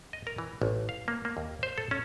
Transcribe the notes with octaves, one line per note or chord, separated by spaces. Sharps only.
D#5
A#4
E3
A1
F5
A#3
A#3
D#2
C5
A4
C#4